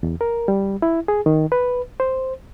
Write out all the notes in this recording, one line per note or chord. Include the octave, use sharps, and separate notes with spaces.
E2
A#4
G3
E4
G#4
D#3
B4
C5